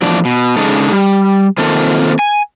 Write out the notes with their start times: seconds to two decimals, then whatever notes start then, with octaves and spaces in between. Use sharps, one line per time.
0.02 E2 A2 F3 D4 D5
0.25 B2
0.57 C#3 G#3 D4 D#4 A4
0.92 G3
1.58 D#3 A#3 C4 F4 A4
2.19 G#5